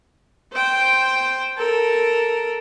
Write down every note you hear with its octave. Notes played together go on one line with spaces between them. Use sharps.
C5 G5
A4 A#4